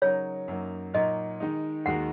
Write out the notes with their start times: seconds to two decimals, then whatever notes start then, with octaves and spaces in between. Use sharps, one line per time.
0.02 C#3 F#3 D#4 A#4 C#5
0.48 F#2 F#3 A#3 D#4
0.94 A#2 F#3 D#4 A#4 D#5
1.40 D#3 G#3 D#4
1.86 D#2 D#3 G#3 F#4 A#4 F#5